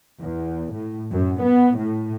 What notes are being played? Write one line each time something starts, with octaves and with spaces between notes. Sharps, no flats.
E2
A2
F#2
B3
A2